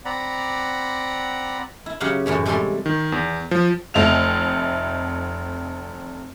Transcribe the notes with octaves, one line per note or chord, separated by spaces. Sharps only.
C4 D5 F#5 A#5 B5
E4
C#3 F#3 G4 B4 F5 F#5
F#2 A2 E3 B3
C3 G3 G#3 C#4 A4 C6
D#3
E2
F3
F1 A3 D#5 F7